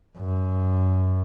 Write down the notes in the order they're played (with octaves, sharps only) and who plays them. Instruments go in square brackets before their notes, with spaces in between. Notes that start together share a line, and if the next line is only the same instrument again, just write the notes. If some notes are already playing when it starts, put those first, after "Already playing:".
[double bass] F#2